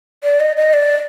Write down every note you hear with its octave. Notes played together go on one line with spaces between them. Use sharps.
D5
D#5
D#5
D5